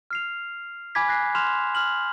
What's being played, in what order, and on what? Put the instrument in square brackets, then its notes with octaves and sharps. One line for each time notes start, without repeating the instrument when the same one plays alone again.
[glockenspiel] F6 C7 F7
G#5 B5 D6 G#6 B6
F#6 A#6 C7
C6 F6 F#6 E7 F7
F6 F#7